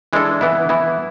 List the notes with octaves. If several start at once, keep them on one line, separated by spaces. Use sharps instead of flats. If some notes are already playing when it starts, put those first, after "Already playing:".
E3 G#3 D4 A4
E3 B3 E4
E3 B3 E4